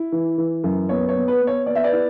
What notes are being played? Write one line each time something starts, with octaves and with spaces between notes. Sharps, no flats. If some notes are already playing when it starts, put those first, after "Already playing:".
Already playing: E4
E3
E3
F#2
B3 C#5
C#5
B3
B4
B3
C#5
B3 D5
E5
B4 D5
E4